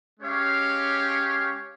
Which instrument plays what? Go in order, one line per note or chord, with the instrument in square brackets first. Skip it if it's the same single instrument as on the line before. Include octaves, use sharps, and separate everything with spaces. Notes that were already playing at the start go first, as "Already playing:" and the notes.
[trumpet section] G#3 C#4 G4 C#5 F5